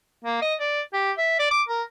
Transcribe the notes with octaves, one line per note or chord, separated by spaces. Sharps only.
A#3
D#5
D5
G4
E5
D5
D6
A#4